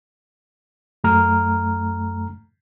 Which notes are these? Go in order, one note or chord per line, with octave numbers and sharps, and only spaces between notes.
F#2 A3 A#5 F6